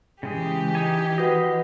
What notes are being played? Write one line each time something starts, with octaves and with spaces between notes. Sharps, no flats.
C#3 E3 G#3 G4 G#4
D#4 G#5
F#4 B4 D#5 F#5